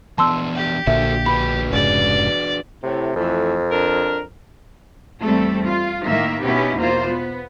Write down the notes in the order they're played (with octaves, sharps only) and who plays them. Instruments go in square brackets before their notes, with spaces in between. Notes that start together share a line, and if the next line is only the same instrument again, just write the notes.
[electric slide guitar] E3 B3 D4 [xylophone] A5 C6 E6
[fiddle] G4
[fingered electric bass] A#1 A#2 D3 [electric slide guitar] F#4 A4 C5 [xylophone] E5
[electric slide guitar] D4 F#4 B4 [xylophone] B5
[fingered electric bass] F1 G#2 C#3 [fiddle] D5
[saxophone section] A2 [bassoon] C3
[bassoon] F2 [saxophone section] E3 A3
[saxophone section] D4 A#4
[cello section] E2 G3 A3 C4 A4
F4
A2 D#3 A#3 E5
B2 B3 C#4 D#4 E4 G4
E2 B2 A#3 F4 C5
B3